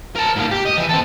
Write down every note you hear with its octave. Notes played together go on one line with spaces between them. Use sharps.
A#4 A5
G#2 A#3
G4
D#5
E3
C4 A4